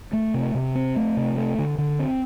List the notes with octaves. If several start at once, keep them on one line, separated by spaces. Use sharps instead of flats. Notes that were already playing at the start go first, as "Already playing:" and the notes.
A3
C3
C3
C4
A3
C3
A3
D3
D3
C4